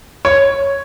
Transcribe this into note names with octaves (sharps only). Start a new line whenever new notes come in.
C#5